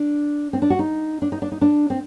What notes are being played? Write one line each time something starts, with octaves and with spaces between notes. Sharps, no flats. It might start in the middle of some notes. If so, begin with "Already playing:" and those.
Already playing: D4
C4
D4
F#4
D#4
D4
D#4
D4
D#4
D4
C4